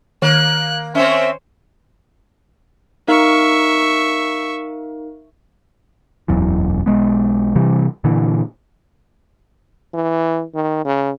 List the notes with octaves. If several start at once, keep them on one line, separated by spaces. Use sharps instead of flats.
D#3 A#3 F#6
C4 C#4 C5 C#5 E5
D#4 A#4 E5 F5 C#6
E1 B1 F#2 E3
B1 G#3 B3
C3 E3 G3
A#2 D3 E3
E3
D#3
C#3